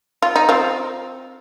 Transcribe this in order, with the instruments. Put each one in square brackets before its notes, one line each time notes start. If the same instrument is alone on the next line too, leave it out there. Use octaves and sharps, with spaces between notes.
[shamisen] F4
D#4
C4 F4